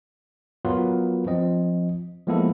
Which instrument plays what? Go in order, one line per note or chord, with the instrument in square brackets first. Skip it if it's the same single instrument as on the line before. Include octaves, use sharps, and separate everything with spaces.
[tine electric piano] F#3 B3 F4 F#4 A#4 B4
F3 C4 D#5
F3 G#3 A#3 B3 E4 A4